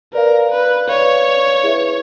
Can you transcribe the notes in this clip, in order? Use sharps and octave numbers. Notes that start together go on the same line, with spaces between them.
A#4 B4 D5 F5
B4
B4 C#5 D5 F5
E4 G#4 B4 E5